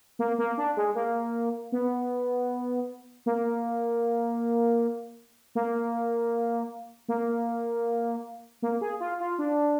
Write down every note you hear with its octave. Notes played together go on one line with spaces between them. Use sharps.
A#3
A#3
D4
G#3
A#3
B3
A#3
A#3
A#3
A#3
G#4
F4
F4
D4